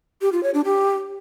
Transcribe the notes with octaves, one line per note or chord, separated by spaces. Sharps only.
G4
F4
C#5
D4
G4